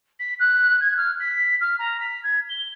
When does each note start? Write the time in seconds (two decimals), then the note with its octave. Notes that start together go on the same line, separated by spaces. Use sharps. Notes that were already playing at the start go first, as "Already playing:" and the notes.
0.19 B6
0.39 F#6
0.80 G#6
0.97 F6
1.20 B6
1.61 F6
1.79 A#5
2.00 B6
2.23 G#6
2.49 G7